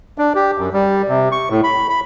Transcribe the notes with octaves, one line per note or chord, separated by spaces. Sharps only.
D4
G4
F#2
G3
C3
C#6
A2
B5
B5